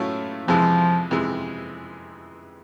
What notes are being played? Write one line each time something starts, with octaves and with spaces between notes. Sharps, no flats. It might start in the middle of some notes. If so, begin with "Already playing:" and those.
Already playing: A2 F#3 A3 C#4 F4
F2 C3 E3 F3 G#3
F2 C3 E3 G#3